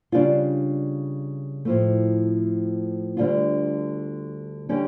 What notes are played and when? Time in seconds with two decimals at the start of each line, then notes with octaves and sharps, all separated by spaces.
0.12 C#3 G3 D4 F4
1.65 A2 F3 A3
3.17 D2 D3 G3 D4 F4
4.69 D3 G3 C#4 G4